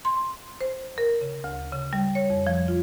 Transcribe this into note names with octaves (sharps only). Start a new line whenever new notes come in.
C6
C5
A#4
C#3
D2
C#3
G3
C#5
F2
F3
F4